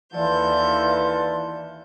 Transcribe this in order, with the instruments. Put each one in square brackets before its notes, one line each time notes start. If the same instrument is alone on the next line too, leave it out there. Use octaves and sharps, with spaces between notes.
[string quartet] D#2 A4 G6 [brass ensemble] E3 [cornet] F4 [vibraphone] D5